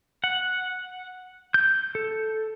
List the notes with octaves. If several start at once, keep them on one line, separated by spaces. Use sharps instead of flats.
F#5
G6
A4